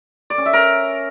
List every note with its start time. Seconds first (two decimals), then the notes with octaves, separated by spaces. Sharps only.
0.30 D5
0.38 C#4
0.46 E5
0.53 A#4